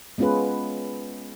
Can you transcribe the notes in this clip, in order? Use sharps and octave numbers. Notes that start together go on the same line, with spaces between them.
G#3 B3 C#4 F4 G#4 B4